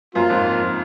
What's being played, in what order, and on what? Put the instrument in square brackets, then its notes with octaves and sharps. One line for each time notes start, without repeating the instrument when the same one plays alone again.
[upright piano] F#2 [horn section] F3 A#3 F4
[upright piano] F2 G#2